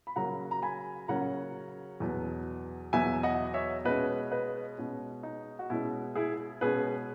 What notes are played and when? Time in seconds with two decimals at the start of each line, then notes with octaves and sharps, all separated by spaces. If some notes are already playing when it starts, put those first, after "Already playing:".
0.07 B5
0.16 C#3 F#3 A#3 C#4 F#5 A#5
0.51 A#5
0.62 G#5 B5
1.08 C#3 F#3 A#3 C#4 F#5 A#5
2.00 E2 B2 F#3 B3
2.93 E2 B2 F#3 B3 E5 G#5
3.23 D#5 F#5
3.54 C#5 E5
3.85 B2 G#3 C#4 B4 D#5
4.31 B4 D#5
4.78 B2 G#3 C#4
5.23 D#4
5.59 F#4
5.70 B2 G#3 C#4 E4
6.15 E4 G#4
6.61 B2 G#3 C#4 G#4 B4